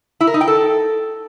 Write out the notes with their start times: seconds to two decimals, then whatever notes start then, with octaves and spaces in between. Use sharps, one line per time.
0.21 E4
0.27 A#4
0.34 D#4
0.41 G5
0.48 A4